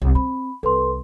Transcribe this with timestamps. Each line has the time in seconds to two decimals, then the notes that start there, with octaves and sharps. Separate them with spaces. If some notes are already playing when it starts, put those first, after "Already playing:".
0.02 C2 F3
0.15 C4 B5
0.63 C2 A4 B4 C6